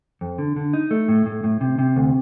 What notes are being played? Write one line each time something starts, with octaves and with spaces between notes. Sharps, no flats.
F2
D3
D3
D#4
A3
A2
A2
A2
C3
C3
D2